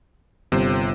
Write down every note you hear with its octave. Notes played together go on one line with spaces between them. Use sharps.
G1 C3 C5